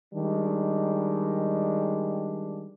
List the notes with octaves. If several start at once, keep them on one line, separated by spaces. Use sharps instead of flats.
D#3 G3 G#3 D4